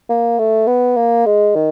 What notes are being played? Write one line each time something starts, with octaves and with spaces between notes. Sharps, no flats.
A#3
A3
B3
A#3
G#3
D#3